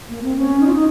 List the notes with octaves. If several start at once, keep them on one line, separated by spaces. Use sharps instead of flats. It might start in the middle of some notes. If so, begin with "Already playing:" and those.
A#3
C4
C#4
D#4
F4
D#4